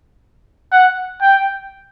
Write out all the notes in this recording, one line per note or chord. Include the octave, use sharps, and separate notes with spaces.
F#5
G5